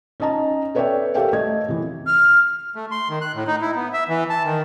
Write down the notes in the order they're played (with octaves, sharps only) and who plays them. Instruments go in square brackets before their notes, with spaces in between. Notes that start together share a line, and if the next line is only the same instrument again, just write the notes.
[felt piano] C#4 D#4 D#5 A5 A#5
A4 B4 C#5 D5 E5 G5
G4 A4 A#4 E5 F5 G5
A3 D#5 G#6
C3 E3
[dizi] F6
[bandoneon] A3
C6
D#3
F#6
A2
D#4
E4
B3
E5
E3
A5
D#3